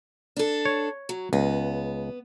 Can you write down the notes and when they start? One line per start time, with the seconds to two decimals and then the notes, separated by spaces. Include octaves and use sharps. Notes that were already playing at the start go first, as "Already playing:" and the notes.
0.37 D4 A4
0.65 C#5
1.09 F#3
1.33 C#2 B3